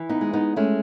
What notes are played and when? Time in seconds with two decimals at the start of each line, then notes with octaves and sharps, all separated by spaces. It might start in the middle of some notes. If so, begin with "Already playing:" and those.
Already playing: E3
0.09 B3 D#4
0.21 G#3
0.33 B3 D#4
0.56 G#3 A3 C#4